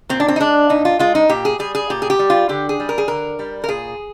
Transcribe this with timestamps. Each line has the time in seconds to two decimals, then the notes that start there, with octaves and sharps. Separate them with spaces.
0.09 A#2 C4
0.20 D4
0.28 C4
0.36 D#4
0.40 G#3 D4
0.70 A#2 D#4
0.85 F4
0.99 G#3 F4
1.15 D#4
1.29 A#2 G4
1.45 G#4
1.59 G3 G#4
1.75 G#4
1.90 A#2 G4
2.02 G#4
2.10 G4
2.19 G3
2.30 F4
2.49 D3 G4
2.69 G#4
2.80 G3
2.89 A#4
2.98 G#4
3.08 D3 A#4
3.39 G3
3.64 A#4
3.69 A#2 G#4